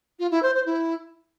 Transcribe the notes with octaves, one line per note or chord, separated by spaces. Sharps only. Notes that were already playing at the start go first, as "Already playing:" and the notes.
F4
E4
C5
C5
E4